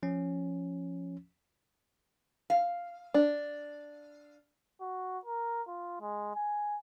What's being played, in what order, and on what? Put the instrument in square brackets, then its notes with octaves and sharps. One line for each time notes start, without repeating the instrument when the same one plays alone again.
[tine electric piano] F3 C#4
[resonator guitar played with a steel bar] F5
[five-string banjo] D4
[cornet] F#4
A#4
F4
G#3
G#5